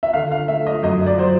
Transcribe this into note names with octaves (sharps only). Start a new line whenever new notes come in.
E5
D3 F5
F5
A3 E5
D#5
F#2 D#5
D5
F#3 C5